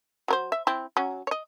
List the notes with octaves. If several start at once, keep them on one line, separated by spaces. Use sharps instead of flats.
F#3 A#4 C5
E5
C4 E4
F#3 C#4
C#5 D#5